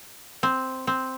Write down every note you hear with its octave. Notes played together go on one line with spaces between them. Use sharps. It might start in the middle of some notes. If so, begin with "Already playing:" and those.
C4
C4